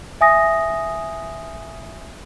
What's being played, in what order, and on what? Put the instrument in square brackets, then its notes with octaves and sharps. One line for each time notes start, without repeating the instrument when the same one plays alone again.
[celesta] E5 G#5 D#6 A#6